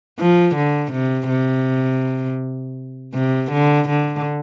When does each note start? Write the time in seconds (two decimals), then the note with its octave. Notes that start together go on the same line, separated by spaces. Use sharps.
0.19 F3
0.56 D3
0.93 C3
1.29 C3
3.14 C3
3.52 D3
3.89 D3